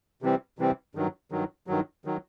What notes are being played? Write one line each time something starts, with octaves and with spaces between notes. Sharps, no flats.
C3 E3 G3 C4
C3 E3 G3 C4
G2 D#3 F#3
G2 D#3 F#3
G2 D#3 F#3
D#3 F#3